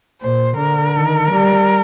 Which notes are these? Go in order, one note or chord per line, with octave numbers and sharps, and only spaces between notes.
A#2 C5
D3 A#4
D#3
G3